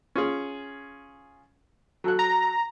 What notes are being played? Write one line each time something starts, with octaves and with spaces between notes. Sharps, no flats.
C#4 F4 G#4
F#3 A4 F#6
A#5